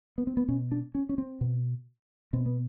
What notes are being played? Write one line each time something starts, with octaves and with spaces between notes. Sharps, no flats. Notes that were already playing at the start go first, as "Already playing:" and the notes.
B3
C4
B3
B2 C#4
D4
C#4
C#4
C4
B2
B2 C4
B3